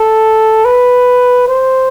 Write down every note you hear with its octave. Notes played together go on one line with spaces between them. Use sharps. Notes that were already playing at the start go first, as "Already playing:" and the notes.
Already playing: A4
B4
C5